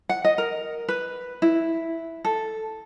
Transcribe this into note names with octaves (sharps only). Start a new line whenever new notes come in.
F#5
D#5
A#4
B4
E4
A4